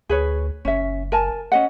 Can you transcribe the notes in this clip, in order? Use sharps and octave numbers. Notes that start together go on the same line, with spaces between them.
D2 G#4 B4 C#5
F#1 C#4 E5
A#4 G#5 A5
C#4 D#5 F#5